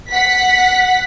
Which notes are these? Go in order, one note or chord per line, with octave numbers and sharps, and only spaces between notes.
F#5 B6